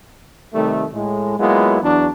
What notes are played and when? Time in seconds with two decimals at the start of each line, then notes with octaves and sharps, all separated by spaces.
0.54 C3 D#3 G3 A3
0.93 A2 G#3
1.40 F#3 G#3 A#3 B3 E4 F4
1.83 E2 F#3 D4